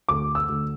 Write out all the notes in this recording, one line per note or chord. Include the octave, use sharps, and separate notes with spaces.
D2 D6
E6
D2